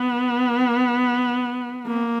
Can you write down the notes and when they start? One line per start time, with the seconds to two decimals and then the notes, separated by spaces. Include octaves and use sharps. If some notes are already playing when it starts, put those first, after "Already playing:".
Already playing: B3
1.87 A#3